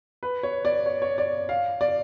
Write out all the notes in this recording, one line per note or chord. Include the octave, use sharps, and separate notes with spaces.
B4
C#5
D5
C#5
C#5
D5
F5
D5